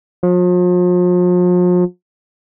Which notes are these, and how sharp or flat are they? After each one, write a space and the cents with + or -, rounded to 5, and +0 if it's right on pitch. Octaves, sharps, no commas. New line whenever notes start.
F3 +40